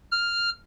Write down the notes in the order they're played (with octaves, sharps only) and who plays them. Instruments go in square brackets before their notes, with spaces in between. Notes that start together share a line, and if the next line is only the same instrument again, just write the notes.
[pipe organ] F6